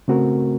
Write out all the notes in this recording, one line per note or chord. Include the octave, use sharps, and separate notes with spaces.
C#3 A3 C4 F#4 A#4